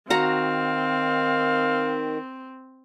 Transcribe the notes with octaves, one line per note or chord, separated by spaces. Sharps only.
D#3 C4 F#4 F5 F#5 A#5